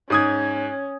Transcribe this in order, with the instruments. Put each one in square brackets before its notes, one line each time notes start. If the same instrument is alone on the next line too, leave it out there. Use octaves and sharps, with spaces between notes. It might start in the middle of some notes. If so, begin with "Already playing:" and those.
[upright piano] G#2 D#6 G#6 [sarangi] C#4